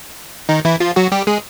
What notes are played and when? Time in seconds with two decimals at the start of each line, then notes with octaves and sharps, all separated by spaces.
0.49 D#3 D#4
0.65 E3 E4
0.80 F3 F4
0.96 F#3 F#4
1.12 G3 G4
1.27 G#3 G#4